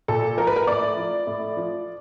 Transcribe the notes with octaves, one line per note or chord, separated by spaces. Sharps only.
A#2 A4
F3 A#4
B4
A#4
A2 D5
F3
A2
F3